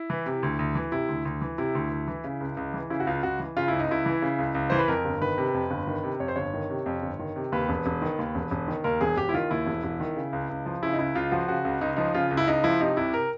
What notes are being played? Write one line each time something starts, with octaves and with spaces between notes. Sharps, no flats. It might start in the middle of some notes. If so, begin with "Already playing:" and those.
Already playing: E4
E3
C3
D2
D2
E3
C3 E4
D2
D2
E3
C3 E4
D2
D2
E3
C#3
C#2
C#2
E3
C#3 E4
F#4
C#2 F4
C#2 F#4
E3
C#3 F4
C#2 E4
D#4
C#2 E4
E3
C#3
C#2
C#2
E3 C5
B4
F2 A#4
G1
D#3 B4
C3
F2
G1
D#3
C3
F2 C#5
C5
G1 C#5
D#3
C3
F2
G1
D#3
C3
D#2 B4
E1
E1
D#3
D#2
E1
E1
D#3
D#2 A#4
E1 G#4
E1 G4
E4
D#3 F4
D#2 E4
E1
E1
D#3
C#3
C#2
C#2
F3
C#3 E4
D#4
C#2 E4
C#2 F4
F3 F#4
C#3 F#4
C#2
C#2 D#4
F3 D#4
C#3 F4
C#2
E4
C#2 D#4
F3 E4
C3 D#4
C2 E4
A#4